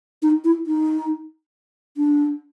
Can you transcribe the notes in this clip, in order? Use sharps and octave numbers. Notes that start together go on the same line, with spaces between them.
D#4
E4
D#4
D4